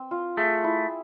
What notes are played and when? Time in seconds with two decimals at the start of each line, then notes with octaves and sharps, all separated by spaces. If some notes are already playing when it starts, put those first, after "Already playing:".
Already playing: C4
0.11 F4
0.37 A3 G#4
0.64 E4